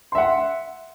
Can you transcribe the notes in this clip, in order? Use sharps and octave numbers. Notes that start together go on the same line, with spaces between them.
E5 F#5 C6